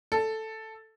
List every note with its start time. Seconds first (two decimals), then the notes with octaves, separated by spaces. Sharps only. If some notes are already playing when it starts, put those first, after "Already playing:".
0.12 A4